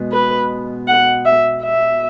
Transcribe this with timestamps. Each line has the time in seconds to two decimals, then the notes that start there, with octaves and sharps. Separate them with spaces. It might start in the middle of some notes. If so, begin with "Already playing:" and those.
Already playing: B2 G#3 B3
0.12 B4
0.88 F#5
1.25 E5
1.63 E5